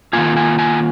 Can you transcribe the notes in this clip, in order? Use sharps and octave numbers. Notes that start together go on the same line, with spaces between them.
D#3 A#3 F4 G#5
G#5
G#5